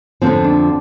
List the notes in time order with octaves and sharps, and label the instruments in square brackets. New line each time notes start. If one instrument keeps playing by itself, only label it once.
[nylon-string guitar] F2 D3 F3 [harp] C4
[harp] D4